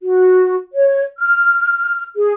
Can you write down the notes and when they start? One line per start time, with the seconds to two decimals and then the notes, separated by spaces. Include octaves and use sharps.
0.01 F#4
0.74 C#5
1.18 F6
2.17 G#4